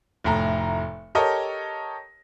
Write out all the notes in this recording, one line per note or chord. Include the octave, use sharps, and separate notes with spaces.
F1 A2 A#5
G4 A4 A#4 C#5 D#5